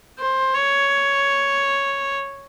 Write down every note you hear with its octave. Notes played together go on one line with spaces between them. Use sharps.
C5
C#5